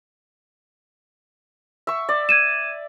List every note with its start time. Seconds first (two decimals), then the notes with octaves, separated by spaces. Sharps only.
1.87 E5 C#6
2.09 D5
2.29 G#6 D#7 E7